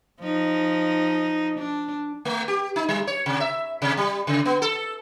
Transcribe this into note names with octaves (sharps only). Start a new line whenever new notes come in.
F3 D#4
D4
A3
G4
D#4
G3
C#5
C3
E5
C3
G3
C#3
B3
A4